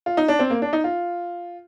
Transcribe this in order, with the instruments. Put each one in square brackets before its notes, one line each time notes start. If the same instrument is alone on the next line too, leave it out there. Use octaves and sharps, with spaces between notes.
[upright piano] F4
D#4
D4
C4
A#3
D4
D#4
F4